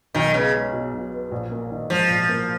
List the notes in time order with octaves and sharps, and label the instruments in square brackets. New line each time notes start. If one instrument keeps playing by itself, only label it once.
[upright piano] B1 [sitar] D#3
[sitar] C#3 [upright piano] B3
[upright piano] G#3
B2
B1
B3
A#1
A#3
D#3
[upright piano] G#2 [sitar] F3
[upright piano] A#1
A#3